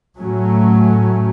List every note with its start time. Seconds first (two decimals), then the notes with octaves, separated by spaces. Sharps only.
0.20 A2 F#3 A3 C#4